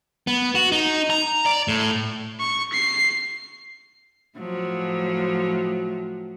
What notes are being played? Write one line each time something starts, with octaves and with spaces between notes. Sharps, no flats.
B3
F#4
D#4
A#5
D5
A2
C#6
C7
A2 F3 F#3